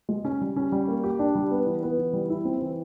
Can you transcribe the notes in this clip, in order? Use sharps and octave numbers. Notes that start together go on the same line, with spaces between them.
G#3
C#4
G3
C#4
G3
A#3
G4
D4
G3
B3
E3
B3
E3
G3
E4
C4
E3